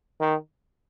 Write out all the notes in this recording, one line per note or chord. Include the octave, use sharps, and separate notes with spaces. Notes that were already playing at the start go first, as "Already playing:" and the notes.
D#3